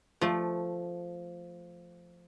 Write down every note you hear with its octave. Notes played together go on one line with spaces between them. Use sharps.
F3 A3